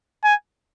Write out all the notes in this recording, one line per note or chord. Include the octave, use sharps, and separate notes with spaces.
G#5